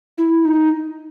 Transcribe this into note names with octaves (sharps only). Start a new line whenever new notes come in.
E4
D#4